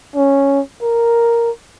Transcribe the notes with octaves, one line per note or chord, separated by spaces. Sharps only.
C#4
A#4